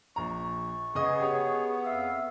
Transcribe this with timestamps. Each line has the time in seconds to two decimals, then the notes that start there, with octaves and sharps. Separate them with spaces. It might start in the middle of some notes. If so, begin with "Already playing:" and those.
0.16 A#1 A#5 C#6
0.95 C#3 B3 G#4 D#5 D#6
1.20 G4 C#5
1.85 F2 E5 F5 E6